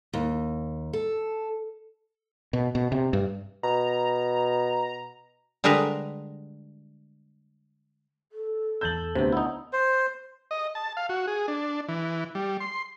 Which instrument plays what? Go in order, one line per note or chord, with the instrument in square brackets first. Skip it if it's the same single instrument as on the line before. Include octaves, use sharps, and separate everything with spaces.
[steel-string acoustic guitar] D#2
A4
[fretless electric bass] B2
B2
C3
G2
[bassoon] B2 [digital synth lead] A#5
[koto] D3 G3 G#3 A#4 B4 A#5
[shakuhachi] A4
[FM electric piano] E2 A5 E6 [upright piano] G6 A6 F#7
[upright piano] D2 [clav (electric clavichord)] C3 [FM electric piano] B3 C5
[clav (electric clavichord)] D#4 E4 [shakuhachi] F#5
[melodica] C5
[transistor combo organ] D#5
A5
F5
F#4
G#4
D4
E3
G3
C6